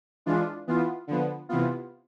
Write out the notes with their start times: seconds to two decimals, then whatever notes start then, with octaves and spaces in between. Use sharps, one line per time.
0.26 E3 G#3 D4 F4
0.67 E3 B3 F4
1.07 D3 F3 B3
1.49 C3 E3 B3 F4